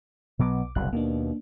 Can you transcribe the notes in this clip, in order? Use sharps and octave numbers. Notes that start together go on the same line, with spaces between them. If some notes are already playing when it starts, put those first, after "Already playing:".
B1 B2 F#3 B3 D6
F#1 C2 B2 F#6
D#2 B2 A#3 D4